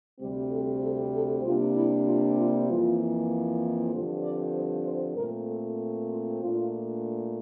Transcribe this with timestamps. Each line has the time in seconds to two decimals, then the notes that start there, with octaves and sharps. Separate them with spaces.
0.21 D2 C3 G3 C4 G4
0.52 A4
0.83 A4
1.14 A4
1.45 C3 G3 A#3 D4 F4
1.76 E4
2.06 F4
2.38 F4
2.69 F2 E3 A#3 F4
3.62 E4
3.93 G2 D3 F3 C4 F4
4.24 D5
4.55 C5
4.86 C5
5.16 A#2 A3 C4 A#4
5.48 A4
6.09 F4
6.40 A#2 A3 D4 F4